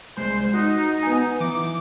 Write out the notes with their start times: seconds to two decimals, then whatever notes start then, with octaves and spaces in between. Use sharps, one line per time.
0.17 C2 G#3 C5 C6
0.54 D#4 F#4
1.03 B3 G#5
1.40 E3 D6